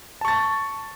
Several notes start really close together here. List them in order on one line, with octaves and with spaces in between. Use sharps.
A5 C#6 A6